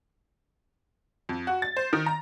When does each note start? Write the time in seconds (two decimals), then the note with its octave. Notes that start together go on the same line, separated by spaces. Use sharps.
1.29 F2
1.47 F#4
1.62 A6
1.77 C5
1.93 D#3
2.06 A#5